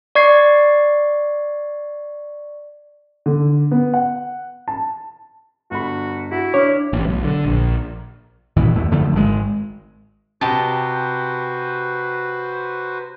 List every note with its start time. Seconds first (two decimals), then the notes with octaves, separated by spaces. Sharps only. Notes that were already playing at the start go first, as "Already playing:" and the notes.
0.15 D5 C#6 G#6 C7
3.26 D3
3.71 B3
3.94 F#5
4.68 A5
5.71 G1 F#4 B5
6.31 E4 F#4
6.54 D4 C#5 D6 F6
6.93 A1
7.09 B1
7.24 D3
7.45 A#1
8.57 F#2 A#2 D#3 E3
8.76 E2 A3
8.91 F#2 D3 F3 A3
9.13 G#1 G#3
10.41 C3 F#4 G4 B4 C5 D#5 A5